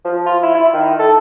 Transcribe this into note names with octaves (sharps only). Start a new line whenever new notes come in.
F3
F4
E4
E4
D#3
A4